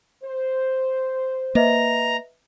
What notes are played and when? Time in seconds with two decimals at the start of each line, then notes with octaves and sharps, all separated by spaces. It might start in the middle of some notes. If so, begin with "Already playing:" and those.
0.23 C5
1.55 A#3 B4 D#5 E5 A#5